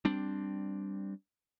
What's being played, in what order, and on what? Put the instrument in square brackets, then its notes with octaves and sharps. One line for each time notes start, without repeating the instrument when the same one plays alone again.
[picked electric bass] G3 C4 D4